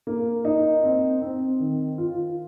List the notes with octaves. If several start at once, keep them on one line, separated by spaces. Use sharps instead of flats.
A#3
D#4
C4
C4
D#3
F4